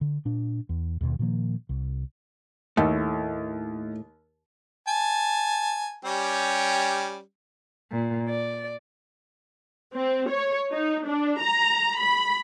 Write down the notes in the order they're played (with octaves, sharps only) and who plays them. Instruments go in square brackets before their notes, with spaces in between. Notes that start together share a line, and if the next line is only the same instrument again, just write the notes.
[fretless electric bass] D3
A#2 D4
E2
D#2 B2 D#3
A#2 D#3 F3 A#3
C2
[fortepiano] D#2 [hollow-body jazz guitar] A2 A3
[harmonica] G#5 A5
G3 C#4 G4
[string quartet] A#2
D5
[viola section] C4
C#5
D#4
D4
A#5
B5